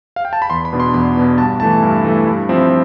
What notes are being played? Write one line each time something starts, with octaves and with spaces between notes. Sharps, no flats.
F5
G5
A5
B5
E2 C6
B5
B2 B3 D4
C6
E2 B5
B2 B3 D4
G2 A5
E3 A3 E4 A5
G2
E3 A3 E4
G2
F3 C4 E4